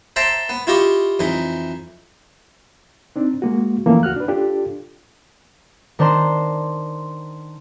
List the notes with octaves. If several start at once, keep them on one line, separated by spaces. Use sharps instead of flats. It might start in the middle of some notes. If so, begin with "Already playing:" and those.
C5 E5 G5 A5 A#5 C6
B3
E4 F4 G4 D#5 C#6
F2 E3 D#4
C4 D4 D#4
G#3 A#3 F#4
E3 F3 A3 A#3 C#4 A4
D2 F#4 F6 F#6
D4 B4
D4 F4 G4 A4
D#3 D4 C5 A#5 C6 C7